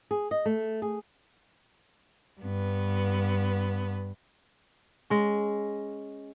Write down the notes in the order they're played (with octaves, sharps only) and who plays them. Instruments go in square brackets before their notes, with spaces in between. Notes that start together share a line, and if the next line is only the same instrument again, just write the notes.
[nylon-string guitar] G#4
D#5
A3
G#4
[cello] G2 B3
[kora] G#3 C#4